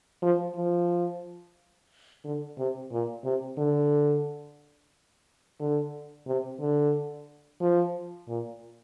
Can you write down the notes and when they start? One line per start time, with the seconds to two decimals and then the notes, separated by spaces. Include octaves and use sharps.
0.22 F3
0.56 F3
2.24 D3
2.58 C3
2.92 A#2
3.24 C3
3.58 D3
5.60 D3
6.27 C3
6.60 D3
7.60 F3
8.28 A#2